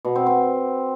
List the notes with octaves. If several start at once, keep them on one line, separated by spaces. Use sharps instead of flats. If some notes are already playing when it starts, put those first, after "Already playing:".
B2
C4
C4